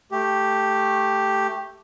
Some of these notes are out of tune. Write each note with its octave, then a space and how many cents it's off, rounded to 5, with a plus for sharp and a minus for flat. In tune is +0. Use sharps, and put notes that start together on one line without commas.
A3 +0 G4 +0